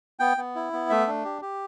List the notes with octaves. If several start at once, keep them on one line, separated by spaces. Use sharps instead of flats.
B3 G5
B3
E4
B3
A3 E5
D4
G4
G4